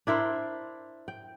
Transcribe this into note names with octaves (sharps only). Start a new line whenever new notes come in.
D4 E4 A#4 C5
G5